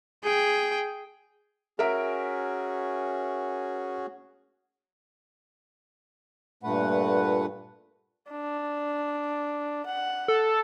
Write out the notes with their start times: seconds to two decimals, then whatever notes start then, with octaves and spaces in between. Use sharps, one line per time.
0.24 G#4 G5
1.79 C#4 F#4 G#4 A#4 E5 D7
6.63 G2 A#2 A3 B4 F#5
8.31 D4
9.86 F#5
10.28 A4